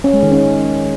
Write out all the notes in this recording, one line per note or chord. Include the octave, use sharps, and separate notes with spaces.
C#4
G#3
D#3
C#4